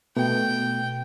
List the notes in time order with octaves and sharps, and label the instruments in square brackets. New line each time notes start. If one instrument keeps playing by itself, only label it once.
[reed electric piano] B2 A3 B3 [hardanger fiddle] G5